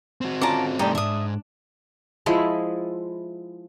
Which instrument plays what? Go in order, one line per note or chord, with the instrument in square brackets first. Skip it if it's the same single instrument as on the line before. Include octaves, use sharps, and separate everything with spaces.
[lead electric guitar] C4 F#4
[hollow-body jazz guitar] D3 C#4 F4 [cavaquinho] A5 A#5 D6
[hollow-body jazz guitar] G#2 C3 D4 [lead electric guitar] G3 A3 [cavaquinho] D#4 G4
[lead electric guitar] E2 G#2 [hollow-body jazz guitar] D4 [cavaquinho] E5 D#6
[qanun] F3 G#3 E4 D#5